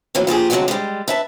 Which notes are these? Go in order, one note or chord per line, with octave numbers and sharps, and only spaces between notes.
A2 E3 F#3 A#3
F3 A#3 G4 G#4
G2 D3 F#3 G#3 C4 F#4
G3 G#3
B4 E5 A5